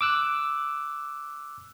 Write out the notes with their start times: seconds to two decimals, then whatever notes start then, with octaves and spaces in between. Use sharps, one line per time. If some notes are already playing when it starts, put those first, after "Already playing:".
0.01 D6 E6 F#6